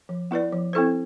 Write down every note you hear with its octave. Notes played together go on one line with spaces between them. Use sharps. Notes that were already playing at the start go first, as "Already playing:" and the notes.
F3
B3 E4 B4 D5
F3
C4 E4 A4 C5